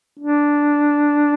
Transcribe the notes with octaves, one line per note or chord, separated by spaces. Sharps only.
D4